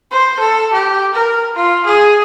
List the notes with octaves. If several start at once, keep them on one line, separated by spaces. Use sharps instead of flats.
C5
A4
G4
A#4
F4
G#4